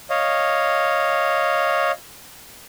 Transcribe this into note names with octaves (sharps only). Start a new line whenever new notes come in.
C#5 D#5 F5